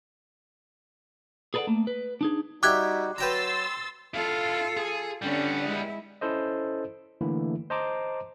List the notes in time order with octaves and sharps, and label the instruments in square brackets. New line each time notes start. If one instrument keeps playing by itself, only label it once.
[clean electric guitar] G#4 A4 B4 C#5 D5 F#5
A3 A#3
B4
D4 D#4 G#4
[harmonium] G3 D#4 F#4 [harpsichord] G4 E5 [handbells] D6 F#6 G#6
[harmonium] F#3 F#4 [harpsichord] B4 G5 A#5 [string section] C6 E6 A6
[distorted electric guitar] E4 F5 [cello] F4 A4
[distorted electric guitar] G#4
[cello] D3 C#4 [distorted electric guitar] G3 B3
[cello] G#3 E4
[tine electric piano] C#4 E4 A4 C5 D#5
D3 E3 A3 A#3 E4
C5 D#5 A5 A#5 C6 D6